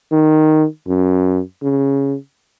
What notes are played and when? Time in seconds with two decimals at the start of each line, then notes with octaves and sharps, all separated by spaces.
0.12 D#3
0.88 F#2
1.62 C#3